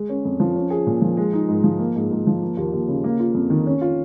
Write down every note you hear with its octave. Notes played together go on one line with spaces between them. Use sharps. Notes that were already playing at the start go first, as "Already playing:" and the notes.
Already playing: G#3
C#4
F2
F3
C#4
G#4
A#2
F3
G#3
D#4
G#2
F3
A#3
G#2
G#2
F3
A#3
D#2
D#2
C#3
A#3
F4
F2
D#3
C#4
F4